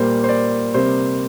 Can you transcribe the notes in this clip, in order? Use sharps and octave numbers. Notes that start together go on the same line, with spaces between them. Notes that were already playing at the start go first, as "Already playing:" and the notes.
Already playing: A#2 G3 A#3 C5
C5
D5
C3 G3 A#3 C5